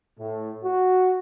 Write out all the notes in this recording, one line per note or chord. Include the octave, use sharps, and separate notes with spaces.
A2 A3
F#4